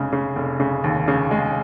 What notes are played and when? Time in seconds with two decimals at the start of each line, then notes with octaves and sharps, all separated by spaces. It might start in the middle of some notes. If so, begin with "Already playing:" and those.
Already playing: F1 C#3 G#3
0.13 C#3
0.36 F1
0.60 C#3
0.84 D#2
1.08 C#3
1.31 G#3